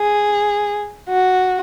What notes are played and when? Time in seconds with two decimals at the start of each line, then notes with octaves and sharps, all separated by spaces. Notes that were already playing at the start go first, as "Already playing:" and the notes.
Already playing: G#4
1.08 F#4